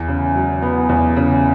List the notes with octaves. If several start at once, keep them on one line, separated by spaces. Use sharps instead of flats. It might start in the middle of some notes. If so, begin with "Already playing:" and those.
Already playing: E2
C#3
F#3
B3
E2
C#3